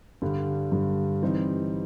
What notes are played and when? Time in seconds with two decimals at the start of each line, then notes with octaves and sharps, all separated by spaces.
0.22 G2 D3 G3
0.72 G2 D3 G3
1.22 E3 G3 C4 D#4